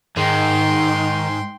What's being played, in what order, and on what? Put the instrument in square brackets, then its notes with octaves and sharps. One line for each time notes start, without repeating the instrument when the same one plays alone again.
[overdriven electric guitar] G#2 G#3 [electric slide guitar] D#3 [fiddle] G5 C6